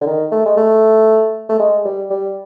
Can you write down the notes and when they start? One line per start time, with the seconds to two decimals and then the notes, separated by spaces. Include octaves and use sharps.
0.01 D3
0.06 D#3
0.32 A3
0.46 G#3
0.57 A3
1.49 A3
1.59 G#3
1.85 G3
2.11 G3